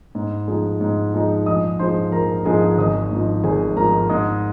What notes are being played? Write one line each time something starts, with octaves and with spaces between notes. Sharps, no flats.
G#2
F3 G#3 D#4
G#2
F3 G#3 D#4
A#1 D#5 D#6
G#2 F3 G#3 C5 C6
A#1 A#4 A#5
G#2 F3 G#3 G#4 G#5
G#1 D#5 D#6
G#2 F3
G#1 G#4 G#5
G#2 F3 A#4 A#5
G#2 D#5 D#6